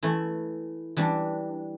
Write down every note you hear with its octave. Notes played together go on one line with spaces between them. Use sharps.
E3 A3 E4
E3 G3 D4